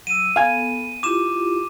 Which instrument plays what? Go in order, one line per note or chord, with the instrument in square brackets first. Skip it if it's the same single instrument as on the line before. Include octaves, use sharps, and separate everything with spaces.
[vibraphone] F#3 E6 [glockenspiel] D#7
[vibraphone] B3 A4 [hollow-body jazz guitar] F5 G#5
[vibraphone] E4 F4 G4 [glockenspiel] D6 E7